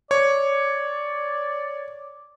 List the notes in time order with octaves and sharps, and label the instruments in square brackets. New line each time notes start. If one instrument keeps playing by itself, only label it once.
[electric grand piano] C#5 [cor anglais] D5